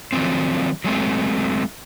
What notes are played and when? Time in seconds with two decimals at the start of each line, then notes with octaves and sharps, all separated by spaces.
0.13 D#3 F3 F#3 A3 C4
0.84 F#3 G#3 A3 C4